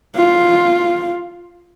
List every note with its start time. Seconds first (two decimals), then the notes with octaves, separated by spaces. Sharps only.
0.16 F4